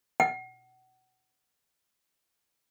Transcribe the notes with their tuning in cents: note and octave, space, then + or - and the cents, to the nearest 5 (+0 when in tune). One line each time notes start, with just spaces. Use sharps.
F#5 +25